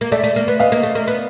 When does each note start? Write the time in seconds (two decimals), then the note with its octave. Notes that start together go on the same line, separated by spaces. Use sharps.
0.01 A#3
0.12 A3 D5 E5
0.24 A3
0.36 A#3
0.48 B3
0.59 B3 D#5 F5
0.72 A#3
0.83 A3
0.95 A#3
1.07 B3